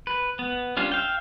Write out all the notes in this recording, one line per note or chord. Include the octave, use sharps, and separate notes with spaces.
B4
B3
G3 C#4 D4 F4
E5 F5 G5